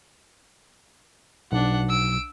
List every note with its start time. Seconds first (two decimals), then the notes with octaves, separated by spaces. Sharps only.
1.52 B1 D4 F#5
1.89 E6 D7